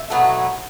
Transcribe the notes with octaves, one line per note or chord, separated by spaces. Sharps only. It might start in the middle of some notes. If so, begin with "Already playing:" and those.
Already playing: E5
B2 F#3 A3